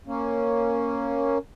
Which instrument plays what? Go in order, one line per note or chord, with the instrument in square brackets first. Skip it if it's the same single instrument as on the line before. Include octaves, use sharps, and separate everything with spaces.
[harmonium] A#3 C#4